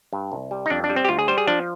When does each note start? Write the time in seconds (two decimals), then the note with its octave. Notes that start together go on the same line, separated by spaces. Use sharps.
0.13 G2
0.32 C2
0.51 G3
0.66 D#4
0.70 F2 D4
0.84 D4
0.90 G3
0.96 C4
1.05 G4
1.09 D2 F4
1.19 G#4
1.28 G3 C5
1.38 G#4
1.47 F3 D4